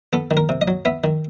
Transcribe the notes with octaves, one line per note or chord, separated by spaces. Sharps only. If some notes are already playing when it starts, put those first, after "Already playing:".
B3 A4
D#3
A#4
C3
D#5
F#3
B3 E5
D#3